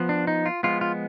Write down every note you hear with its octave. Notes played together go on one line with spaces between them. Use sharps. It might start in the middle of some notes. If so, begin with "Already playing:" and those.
Already playing: F3 B3
D4
D#4
F4
F3 G#3 B3 F4
F4